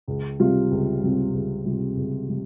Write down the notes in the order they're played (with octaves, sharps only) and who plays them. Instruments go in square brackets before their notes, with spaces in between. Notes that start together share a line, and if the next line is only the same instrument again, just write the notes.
[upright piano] C#2
C3 G3 C4 F4
C#2
C3 G3 C4 F4
C#2
C3 G3 C4 F4
C#2
C3 G3